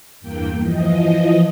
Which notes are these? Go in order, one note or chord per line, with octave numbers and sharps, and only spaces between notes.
E2 G2 A#3 G5
E3 F3 D#5